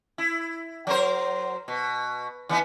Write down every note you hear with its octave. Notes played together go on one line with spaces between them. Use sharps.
E4
F#3 A#4 C5
B2
E3 B3 D#4